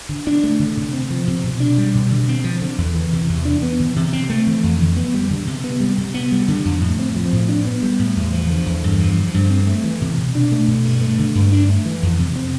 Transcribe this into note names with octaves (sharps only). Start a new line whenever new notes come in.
D3
D4
A3
D3
C3
C4
F3
C3
B2
D4
G3
B2
D3
C4
F3
D3
E2
E3
C3
E2
D4
B3
E3
C3
C4
A3
E3
F2
D3
B3
G3
D3
C3
B3
G3
C3
B3
G3
D3
F2
A2
C4
F3
A2
D4
B3
G3
A2
E2
F3
D3
E2
G2
F3
D3
G2
C4
A3
E3
C3
B2
D4
A3
B2
G2
A3
D3
G2
D4
A3
E3
F2
C3
C4